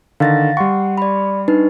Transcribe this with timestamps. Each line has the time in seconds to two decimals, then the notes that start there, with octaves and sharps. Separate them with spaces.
0.20 D3 D#3 F5 A6 A#6
0.57 G3 F#5 C6 C#6
0.98 D5 B5
1.48 D4 D#4 B4